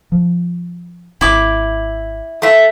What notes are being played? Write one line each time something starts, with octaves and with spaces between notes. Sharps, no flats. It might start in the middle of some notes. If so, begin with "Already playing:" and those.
F3
G#1 E4 D6
A3 E5